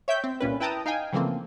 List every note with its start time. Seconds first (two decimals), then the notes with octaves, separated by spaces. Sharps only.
0.08 C#5 E5 G5 G6 B6
0.24 C4
0.40 C2 A#2 C#4 B4
0.60 E4 B4 G5 A5 A#5 D#6
0.86 D#4 F5 G5 G#5
1.13 C#3 E3 F3 A3 A#3 C4